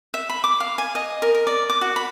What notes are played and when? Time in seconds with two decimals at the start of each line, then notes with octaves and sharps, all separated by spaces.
0.14 E5
0.30 B5
0.44 D6
0.60 F5
0.78 G#5
0.95 D#5
1.22 A#4
1.35 A#4
1.47 D5
1.70 D6
1.81 F#4
1.96 B5